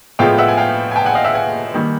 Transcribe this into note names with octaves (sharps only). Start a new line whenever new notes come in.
A2 F3 G#3 B3 F5 G5
E5 F#5
G#5
F5 G5
G#5
G5 A5
F#5 G#5
D#5 F5
E5 F#5
F#5 G#5
D#3 G3 A#3